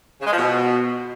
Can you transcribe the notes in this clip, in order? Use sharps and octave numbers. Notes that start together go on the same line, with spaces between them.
C#3
G#3
F3
B2